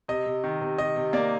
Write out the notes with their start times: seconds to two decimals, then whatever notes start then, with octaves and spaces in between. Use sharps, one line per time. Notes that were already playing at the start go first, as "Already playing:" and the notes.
0.08 C3 D#5
0.26 C3
0.44 D#3
0.61 C3
0.78 C3 D#5
0.96 C3
1.13 A#3 D5